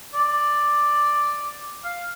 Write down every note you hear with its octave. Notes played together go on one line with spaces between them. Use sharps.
D5
F5